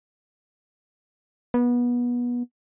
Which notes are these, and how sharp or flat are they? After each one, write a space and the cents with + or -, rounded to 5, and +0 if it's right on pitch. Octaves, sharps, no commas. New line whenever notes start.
B3 -25